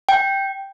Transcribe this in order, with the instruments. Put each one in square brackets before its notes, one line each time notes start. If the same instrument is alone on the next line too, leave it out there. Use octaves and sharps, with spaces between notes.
[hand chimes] G5